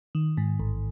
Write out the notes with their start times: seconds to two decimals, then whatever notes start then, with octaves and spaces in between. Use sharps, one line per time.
0.15 D#3
0.37 G#2
0.60 A1